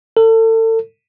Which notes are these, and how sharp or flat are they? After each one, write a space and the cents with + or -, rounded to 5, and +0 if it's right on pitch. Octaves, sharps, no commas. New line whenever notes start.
A4 +35